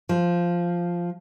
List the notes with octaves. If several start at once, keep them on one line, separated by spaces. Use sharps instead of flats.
F3